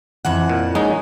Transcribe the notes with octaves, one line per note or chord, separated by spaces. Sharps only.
F2 E3 F#5
A#2
G#3 C#4 D#4